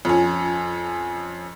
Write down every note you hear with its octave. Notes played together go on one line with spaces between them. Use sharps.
F2 C#4